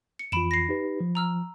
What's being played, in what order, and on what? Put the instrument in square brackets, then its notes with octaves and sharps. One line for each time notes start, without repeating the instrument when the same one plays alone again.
[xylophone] C#7
[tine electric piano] F2 E3 F4 [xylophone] B5 D7 E7
[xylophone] A#6 C7
[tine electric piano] D#4 G4 B4
F3
[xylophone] A#5 E6 F6